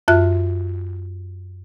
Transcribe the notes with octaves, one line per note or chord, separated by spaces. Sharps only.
F#2 F4 E5 F#6